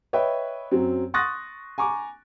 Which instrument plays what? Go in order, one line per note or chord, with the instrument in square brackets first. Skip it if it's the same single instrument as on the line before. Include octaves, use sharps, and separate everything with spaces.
[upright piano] B4 C#5 D#5 E5 G5
F#2 F#3 C4
C6 C#6 D#6 F#6 A6 A#6
G#5 A#5 C#6 D6